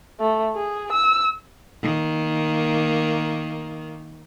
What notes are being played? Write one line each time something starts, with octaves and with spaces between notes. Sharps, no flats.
A3
G#4
E6
D#3 A#3